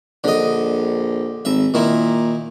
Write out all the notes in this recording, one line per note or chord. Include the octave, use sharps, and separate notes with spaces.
A#1 D3 D#5
G#1 E5
A#2 D#3 E4